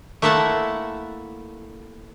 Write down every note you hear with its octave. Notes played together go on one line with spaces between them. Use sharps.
A3 A#3 E4 E5 F#5 A5